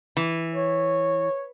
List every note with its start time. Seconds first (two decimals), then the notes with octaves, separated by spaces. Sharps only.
0.17 E3
0.55 C#5